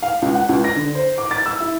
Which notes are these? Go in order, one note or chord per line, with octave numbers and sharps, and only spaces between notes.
F5
C#2
F#5
C#2
A#6
D3
C5
D6
A6
E6
E4